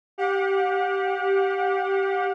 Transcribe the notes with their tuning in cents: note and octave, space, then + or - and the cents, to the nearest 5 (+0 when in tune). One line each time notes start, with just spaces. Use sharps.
G4 -5 F#5 -40